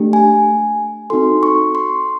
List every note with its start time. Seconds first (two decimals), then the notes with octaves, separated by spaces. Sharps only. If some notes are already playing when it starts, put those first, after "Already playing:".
Already playing: A3 D4 G4
0.13 G#5
1.10 C4 D#4 F#4 A4 C6
1.43 C#6
1.75 C6